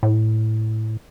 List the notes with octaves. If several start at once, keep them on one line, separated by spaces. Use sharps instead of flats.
A2